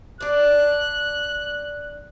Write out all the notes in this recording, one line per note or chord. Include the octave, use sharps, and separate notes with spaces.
D4 D5 F#6